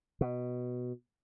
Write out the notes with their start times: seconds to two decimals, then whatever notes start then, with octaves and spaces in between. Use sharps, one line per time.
0.21 B2